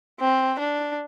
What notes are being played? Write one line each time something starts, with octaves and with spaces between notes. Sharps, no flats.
C4
D4